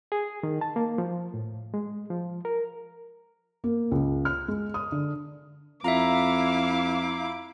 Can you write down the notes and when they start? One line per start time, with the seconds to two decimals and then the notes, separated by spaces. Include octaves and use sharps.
0.12 G#4
0.43 D#3
0.61 A5
0.76 A#3
0.98 F3
1.34 A2
1.74 G#3
2.10 F3
2.45 A#4
3.64 A#3
3.91 C#2
4.25 F6
4.48 G#3
4.74 D#6
4.92 D3
5.84 F2 E4 E5 F5 A#5 D6